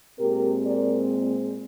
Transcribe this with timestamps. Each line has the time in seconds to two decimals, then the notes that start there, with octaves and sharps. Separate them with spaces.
0.19 A#2 G#3 C4 G4 A#4
0.66 A#4 D5